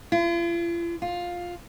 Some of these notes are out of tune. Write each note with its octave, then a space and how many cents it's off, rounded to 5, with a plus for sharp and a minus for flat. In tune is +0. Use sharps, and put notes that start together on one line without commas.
F4 -45
F4 +10